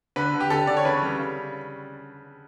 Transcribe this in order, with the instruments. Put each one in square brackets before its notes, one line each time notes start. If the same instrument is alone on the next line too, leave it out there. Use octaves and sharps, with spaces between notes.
[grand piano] D3 B4
D3
G4
D3 A4
D3 D5
C#5
C#3 B4
G3
C#3